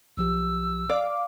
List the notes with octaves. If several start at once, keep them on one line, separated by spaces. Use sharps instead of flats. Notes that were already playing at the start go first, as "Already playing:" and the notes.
B1 F3 G4 E6
D5 F5 D6